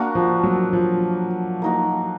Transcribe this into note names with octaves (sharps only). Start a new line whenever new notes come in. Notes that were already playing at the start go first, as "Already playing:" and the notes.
Already playing: A#3 D4 F#4 A#4
F3
F#3
F3
A#3 D#4 F#4